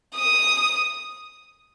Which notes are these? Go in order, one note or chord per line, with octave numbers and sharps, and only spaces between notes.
D#6